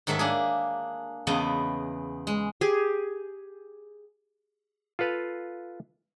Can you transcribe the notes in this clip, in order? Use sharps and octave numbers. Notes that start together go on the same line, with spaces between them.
G#2 D#3 F#3 A4 E5
A#3 D4 G#4
E2 C#3 B3 D#5 A5
G#3
G4 G#4
F4 A4 B4 F5